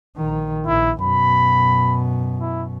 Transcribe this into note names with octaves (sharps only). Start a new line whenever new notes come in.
A#1 D#3
A#1 E4
F#2 B2 B5
E4